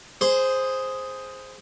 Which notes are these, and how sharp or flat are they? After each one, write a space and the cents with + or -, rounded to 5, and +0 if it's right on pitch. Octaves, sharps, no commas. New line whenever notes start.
G#4 +0 C5 +5 C6 -25